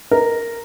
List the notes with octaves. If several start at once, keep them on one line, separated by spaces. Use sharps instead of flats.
A#4